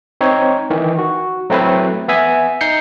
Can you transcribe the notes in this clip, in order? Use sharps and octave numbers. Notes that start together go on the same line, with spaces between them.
C4 D#4 C#5
D#3 E3
F#4
F#3 A3 C4 E4 B4
B3 E5 G#5
D#4 G6 C7 C#7